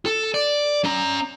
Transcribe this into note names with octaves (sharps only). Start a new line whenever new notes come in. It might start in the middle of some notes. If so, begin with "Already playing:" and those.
A4
D5
C#4 A#5